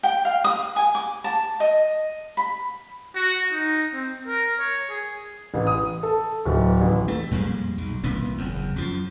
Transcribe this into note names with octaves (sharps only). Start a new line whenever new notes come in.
G5
F5
D#6
G#5
D6
A5
D#5
B5
F#4
D#4
C4
A#4
C#5
G#4
A1
D#6
A4
D1
A1
A3
F2 A#2 G3 G#3
B1
C2 A#2 E3 B3
F#1 E2
F#2 F3